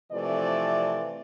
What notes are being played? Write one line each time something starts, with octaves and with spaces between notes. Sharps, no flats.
C3 E3 F3 A3 D5